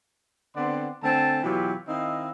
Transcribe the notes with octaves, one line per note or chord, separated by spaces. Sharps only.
D3 B3 C4 D5 F#5 C6
D3 A3 C4 G#5 A5
B2 E3 F#3 F4 G4
D#3 C4 D#4 E4 D#5 F5